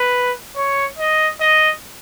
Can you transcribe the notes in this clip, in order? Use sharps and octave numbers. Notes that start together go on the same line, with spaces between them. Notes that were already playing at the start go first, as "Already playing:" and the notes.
Already playing: B4
C#5
D#5
D#5